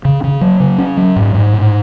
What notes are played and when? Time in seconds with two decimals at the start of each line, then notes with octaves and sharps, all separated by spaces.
0.05 C#3
0.24 C#3
0.41 F#3
0.60 C#3
0.78 C#4
0.97 F#3
1.16 G#2
1.35 G#2
1.54 A2